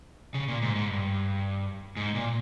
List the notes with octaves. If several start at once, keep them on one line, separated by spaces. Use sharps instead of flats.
C#3
A#2
G#2
G#2
G2
G#2
A#2